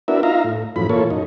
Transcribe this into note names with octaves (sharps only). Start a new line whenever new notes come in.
B3 D4 E4 F#4 A#4 E5
D#4 F4 E5 F5 A#5
A2
F#2 A2 E3 F3 B5
A#2 E3 A#3 F4 A4 C#5
F#2 D#4